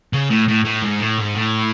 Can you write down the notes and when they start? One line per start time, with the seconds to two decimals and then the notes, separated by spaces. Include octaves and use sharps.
0.13 C#3
0.30 A2
0.48 A2
0.65 A2
0.82 G#2
1.01 A2
1.19 G#2
1.35 A2